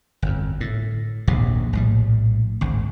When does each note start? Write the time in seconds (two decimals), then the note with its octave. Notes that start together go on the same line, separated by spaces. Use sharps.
0.22 G1 F2
0.60 A2
1.27 D#1 A#1 G#2 C3
1.73 A#1 A2 G3
2.61 G#1 D2